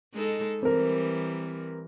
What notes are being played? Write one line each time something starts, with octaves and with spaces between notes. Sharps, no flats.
G#3 D#4 A4
E3 G3 C4 A#4